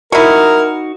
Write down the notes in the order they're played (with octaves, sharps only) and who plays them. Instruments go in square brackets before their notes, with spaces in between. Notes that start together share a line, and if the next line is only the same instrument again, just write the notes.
[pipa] G#3 E4 [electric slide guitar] D#4 F#4 [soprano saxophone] A#4